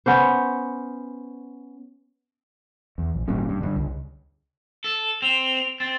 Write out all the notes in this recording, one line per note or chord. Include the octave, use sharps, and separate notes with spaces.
B3 C#4 C5
E2
A#1
G#1 A#2 G3 C#4
G2
G2 D3
C#2
A4
C4 F7
C4 A6